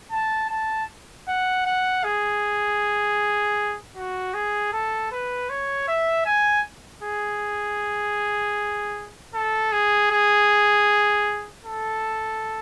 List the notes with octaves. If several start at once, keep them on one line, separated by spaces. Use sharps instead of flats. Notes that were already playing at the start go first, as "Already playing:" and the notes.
A5
A5
F#5
F#5
G#4
F#4
G#4
A4
B4
C#5
E5
G#5
G#4
A4
G#4
G#4
A4